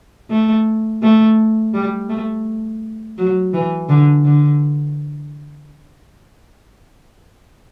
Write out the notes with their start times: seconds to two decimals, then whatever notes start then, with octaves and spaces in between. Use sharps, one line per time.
0.30 A3
1.02 A3
1.74 G3
2.09 A3
3.18 F#3
3.53 E3
3.89 D3
4.25 D3